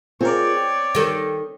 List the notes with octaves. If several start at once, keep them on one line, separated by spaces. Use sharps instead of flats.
C4 F4 G#4 A#4 C#5 D5
G5
D#3 A4